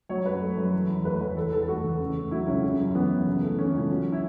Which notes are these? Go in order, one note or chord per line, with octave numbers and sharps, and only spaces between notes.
F#3 C#5
F#2 B4
A3
F#2
E3
E2
A3 B4
E2 B4
E3 A4
E2 A4
A4
A3 F#4
E2
C#3
A3
F#3 E4
C#2 C#4
C#3
F#2
E3 B3
F#2
C#3
A3
E3 C#4
C#2
F#3
E4